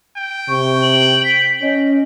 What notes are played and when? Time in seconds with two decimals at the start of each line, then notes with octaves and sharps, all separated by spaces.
0.17 G5
0.49 C3 C#6
0.82 F#7
1.24 B6
1.62 C#4 D#5